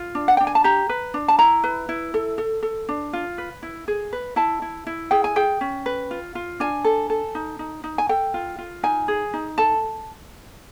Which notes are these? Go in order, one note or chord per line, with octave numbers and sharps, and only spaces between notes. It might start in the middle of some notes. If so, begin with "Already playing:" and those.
Already playing: F4
D4
F#5
D4 G5
G#5
A5
G4 A#5
B4
D4
A5
E4 A#5
B4
E4
A4
A4
A4
D4
F4
B4
E4
G#4
B4
E4 A5
E4
E4
G#4 G5
G#5
G#4 G5
C#4
B4
F4
F4
D4 G#5
A4
A4
D#4
D#4
D#4
G#5
A4 G5
F4
F4
D#4 G#5
G#4
D#4
A4 A5